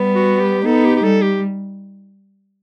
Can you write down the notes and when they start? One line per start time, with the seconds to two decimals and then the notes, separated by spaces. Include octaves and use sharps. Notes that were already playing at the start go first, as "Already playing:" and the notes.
Already playing: G3 B3
0.15 F#4
0.40 G4
0.65 B3 D#4 A4
0.85 G4
0.96 G4
1.03 G3 A4
1.22 G4